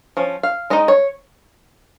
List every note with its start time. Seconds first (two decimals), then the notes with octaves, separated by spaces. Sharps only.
0.17 F3 C#4
0.43 F5
0.70 G#3 D#4 D#5
0.88 C#5